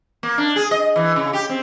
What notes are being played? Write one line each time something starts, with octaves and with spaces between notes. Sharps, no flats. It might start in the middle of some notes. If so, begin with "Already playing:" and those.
A#3
D4
G#4
D#5
E3
C#3
G4
C4